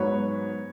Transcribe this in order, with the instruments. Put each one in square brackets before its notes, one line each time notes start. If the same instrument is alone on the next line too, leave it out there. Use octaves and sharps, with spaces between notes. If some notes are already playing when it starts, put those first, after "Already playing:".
Already playing: [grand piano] G#2 F#3 B3 F#4 B4 [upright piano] C#5